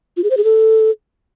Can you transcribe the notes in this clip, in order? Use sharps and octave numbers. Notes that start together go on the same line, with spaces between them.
F4
G#4
C5
G#4
A4